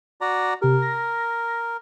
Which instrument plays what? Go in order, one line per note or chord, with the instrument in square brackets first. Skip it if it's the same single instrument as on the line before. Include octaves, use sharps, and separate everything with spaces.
[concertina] F#4 D5 A#5
[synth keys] C3 G4 [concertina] A#4
[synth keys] A#6